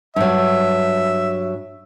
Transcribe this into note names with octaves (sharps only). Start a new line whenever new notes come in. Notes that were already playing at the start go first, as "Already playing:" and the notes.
G2 F#3 E5